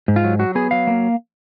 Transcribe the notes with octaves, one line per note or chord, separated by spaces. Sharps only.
G#2
F4
F#3
F#3 F#4
B3 G#4
F#3 F5
A#3